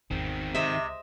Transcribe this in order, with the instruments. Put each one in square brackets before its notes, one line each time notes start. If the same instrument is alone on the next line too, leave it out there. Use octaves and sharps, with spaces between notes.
[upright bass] G#1 E2 [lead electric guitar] D#3 C4
[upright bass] C#2 [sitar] C3 [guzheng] D#5 E5